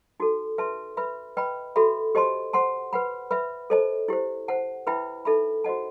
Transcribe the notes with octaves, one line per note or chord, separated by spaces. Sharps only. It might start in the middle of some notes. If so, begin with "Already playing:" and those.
D#4 F#4 A4
B4 E5 A5 C6
B4 E5 B5
B4 D#5 G5 B5
F#4 A4 E5 B5
G4 C5 D#5 A5 C6
C5 F#5 A5 C6
B4 F#5 B5
B4 E5 B5
A4 C5 D#5 A5
E4 G4 C5
C5 F#5 A5
E4 B4 E5 G5 B5
D#4 A4 E5 B5
F#4 C5 D#5 F#5 A5